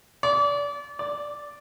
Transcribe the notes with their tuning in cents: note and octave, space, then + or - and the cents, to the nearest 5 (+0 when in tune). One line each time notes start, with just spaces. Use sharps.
D5 -30
D5 +0